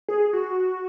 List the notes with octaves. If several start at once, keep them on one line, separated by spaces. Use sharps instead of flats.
G#4
F#4